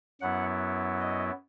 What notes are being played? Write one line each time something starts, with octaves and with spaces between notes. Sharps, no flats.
F#2 F#3 B3 E4 F#5
D#5